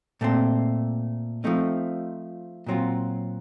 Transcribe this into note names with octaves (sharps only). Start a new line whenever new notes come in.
A#2 A3 C4
F3 A3 C4 D#4
A#2 F#3 C4 F4